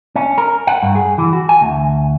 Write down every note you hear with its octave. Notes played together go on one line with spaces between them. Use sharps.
C#4
A#4
F#5
G2
G#4
E3
F#4
G#5
D2